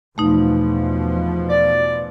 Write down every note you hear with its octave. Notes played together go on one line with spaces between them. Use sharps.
E2 B2 F3 A3 D#4
D5